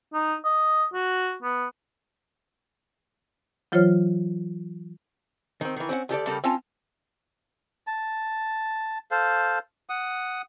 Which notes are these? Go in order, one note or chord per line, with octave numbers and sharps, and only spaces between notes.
D#4
D#5
F#4
B3
E3 F#3 F4 C5 C#5 F6
D#3 C4
D#3 E3
C4 C#4 F#5
D2 G4 A4 D5
C#3 G3 A#3 G4 A4
C4 C#4 F4 A5
A5
A4 C5 F5
F#5 D#6